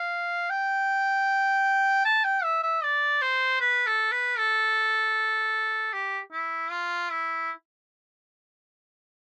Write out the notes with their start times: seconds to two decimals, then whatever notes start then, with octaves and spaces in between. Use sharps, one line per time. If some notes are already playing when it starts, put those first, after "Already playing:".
Already playing: F5
0.50 G5
2.05 A5
2.24 G5
2.43 E5
2.63 E5
2.83 D5
3.22 C5
3.60 B4
3.87 A4
4.12 B4
4.38 A4
5.93 G4
6.32 E4
6.71 F4
7.10 E4